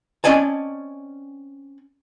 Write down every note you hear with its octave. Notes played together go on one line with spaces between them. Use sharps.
C4 C#4 D5 D#5 G#5 A5